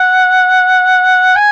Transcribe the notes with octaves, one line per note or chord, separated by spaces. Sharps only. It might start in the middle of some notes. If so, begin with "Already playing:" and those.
Already playing: F#5
G#5